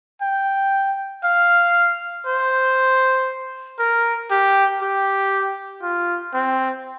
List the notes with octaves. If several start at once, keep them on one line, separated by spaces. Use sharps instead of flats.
G5
F5
C5
A#4
G4
G4
F4
C4